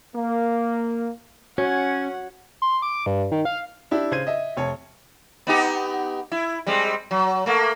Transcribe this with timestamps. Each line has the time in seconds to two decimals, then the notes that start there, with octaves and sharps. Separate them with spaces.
0.15 A#3
1.58 C#4 F#4 C#5 F#5
2.62 C6
2.82 D6
3.06 G2
3.31 D#3
3.45 F5
3.91 D4 E4 G4
4.11 C#3 C5 G#6 D#7
4.27 D#5 E5
4.57 F1 C#5 A5
5.47 B3 D#4 G4
6.32 E4
6.67 G3 G#3 C4
7.11 F#3
7.46 A3 A#3